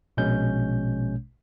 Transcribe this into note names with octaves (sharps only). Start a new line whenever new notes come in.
A#1 B2 G#3 C#4 G6